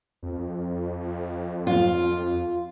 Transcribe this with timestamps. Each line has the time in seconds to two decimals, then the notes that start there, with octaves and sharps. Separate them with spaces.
0.23 F2
1.67 F4